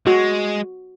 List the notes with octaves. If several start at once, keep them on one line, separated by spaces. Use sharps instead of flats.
G#3 F#4